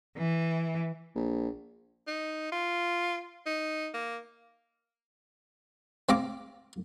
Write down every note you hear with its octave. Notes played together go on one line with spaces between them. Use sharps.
E3
A#1
D#4
F4
D#4
A#3
C4 F5 A#5 D6